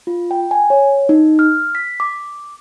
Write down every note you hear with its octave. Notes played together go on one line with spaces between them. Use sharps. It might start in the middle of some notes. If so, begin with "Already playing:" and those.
F4
G5
G#5
C#5
D#4
F6
B6
D6